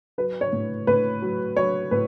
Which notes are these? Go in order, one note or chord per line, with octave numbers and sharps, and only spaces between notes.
F#3 B4
C#5
A2
A2 B4
F#3
F#3 C#5
A2 B4